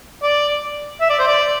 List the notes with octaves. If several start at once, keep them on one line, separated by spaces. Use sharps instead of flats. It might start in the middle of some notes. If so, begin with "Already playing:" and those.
D5
E5
D5
C5
D5